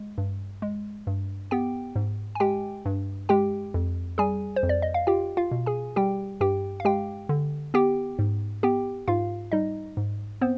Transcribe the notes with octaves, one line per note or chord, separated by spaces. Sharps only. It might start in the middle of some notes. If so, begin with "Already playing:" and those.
Already playing: G#3
G2
G#3
G2
B3 G4 G5
G#2
G#5
G#3 G4 G5
G2
G#3 G4 G5
F2
G3 G#4 G#5
C5
F2
D5
D#5
F5
F4 G4 G5
F4 F5
B2
G#4 G#5
G3 G4 G5
G2 G4 G5
F5
G#3 G4 G5
D3
B3 G4 G5
G#2
B3 G4 G5
G#2 F4 F5
G3 D#4 D#5
G#2
B3 C4 C5